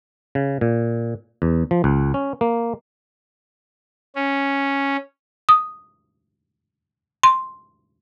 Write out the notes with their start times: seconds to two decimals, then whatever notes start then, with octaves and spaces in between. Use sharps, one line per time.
0.35 C#3
0.61 A#2
1.42 E2
1.71 F3
1.84 C#2
2.14 C#4
2.41 A#3
4.16 C#4
5.49 D#6
7.23 C6